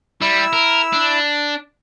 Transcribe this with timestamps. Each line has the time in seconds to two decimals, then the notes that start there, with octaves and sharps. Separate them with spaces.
0.21 G3 E4 E6
0.53 A#4
0.93 D4